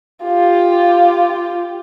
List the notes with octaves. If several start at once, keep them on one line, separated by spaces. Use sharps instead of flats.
F4 G4